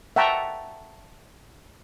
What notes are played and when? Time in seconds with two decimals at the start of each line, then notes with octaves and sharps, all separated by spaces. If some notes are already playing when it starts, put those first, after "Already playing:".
0.16 E5 F#5 G5 A5 A#5 C#6